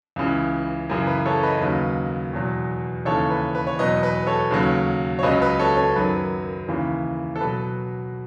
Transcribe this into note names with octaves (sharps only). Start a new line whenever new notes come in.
C#2 C#3 E3
F#2 C#3 E3
B4
A4 C#5
B4 D#5
D#2 C#3 F#3
E2 B2 F#3
D#2 C#3 E3 A4 C#5
B4
B4
C#5
E2 B2 F#3 B4 D#5
B4
A4 C#5
D#2 C#3 F#3
C#5
C#2 C#3 F#3 B4 D#5
B4
A4 C#5
A4 C#5
F#2 D#3 F#3 B4
D#2 C#3 E3
A4
B2 F#3 B4